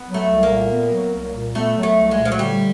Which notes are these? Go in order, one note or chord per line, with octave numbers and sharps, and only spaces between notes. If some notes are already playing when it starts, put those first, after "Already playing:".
Already playing: B3
F#3
A3
C2
A#3
A#2
B3
F#3
C2
A#2
A3 B3
F#3
A3
C2
G#3
A#2
F3
F#3
D3 G3